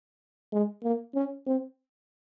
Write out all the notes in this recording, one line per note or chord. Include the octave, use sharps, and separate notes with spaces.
G#3
A#3
C#4
C4